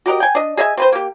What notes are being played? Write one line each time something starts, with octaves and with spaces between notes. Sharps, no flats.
F#4 G4 A#4 D#5
G5 G#5
D4 D#5
G#4 D#5 E5 G#5
C4 B4 C5
A#3 G4